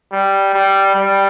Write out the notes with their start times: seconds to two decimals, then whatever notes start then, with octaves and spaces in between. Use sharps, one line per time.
0.12 G3
0.54 G3
0.95 G3